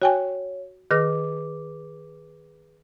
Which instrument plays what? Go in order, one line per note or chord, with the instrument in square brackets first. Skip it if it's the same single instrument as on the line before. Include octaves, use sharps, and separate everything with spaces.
[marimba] F#4 G5 G#5 [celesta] C#5
[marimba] D#3 F6 A#6 [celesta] G#4 B4 D6